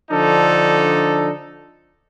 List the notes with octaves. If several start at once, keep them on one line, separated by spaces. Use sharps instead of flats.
D3 F3 D4 D#4 A4